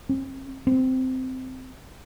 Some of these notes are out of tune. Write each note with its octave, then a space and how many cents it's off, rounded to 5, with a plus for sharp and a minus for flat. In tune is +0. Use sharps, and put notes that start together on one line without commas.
C4 +40
C4 -15